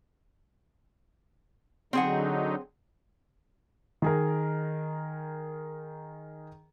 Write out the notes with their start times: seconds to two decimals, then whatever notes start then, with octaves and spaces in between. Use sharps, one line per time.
1.93 D3 F#3 C4 D#4 G#4 F#5
4.02 D#3 G#4 A#4